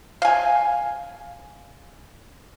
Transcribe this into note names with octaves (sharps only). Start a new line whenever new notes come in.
F5 G#5